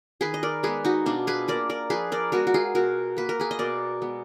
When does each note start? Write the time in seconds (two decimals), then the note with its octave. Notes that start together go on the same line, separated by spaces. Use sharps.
0.21 D#3 G#4 B4
0.34 D#5
0.43 A#4 D5
0.63 G#3 B3 G#4 B4
0.85 D#4 F#4
1.06 B2 D4 F4
1.27 G#4 B4
1.48 A#3 A#4 D5
1.69 A#4 D5
1.90 F3 G#4 B4
2.12 A#4 D5
2.32 G#3 B3 F#4 A#4
2.47 F#4
2.54 F4 G#4
2.75 B2 F#4 A#4
3.17 A#3 B4
3.29 A#4
3.40 G#4 B4
3.51 D#5
3.59 B2 A#4 D5
4.02 G#3 B3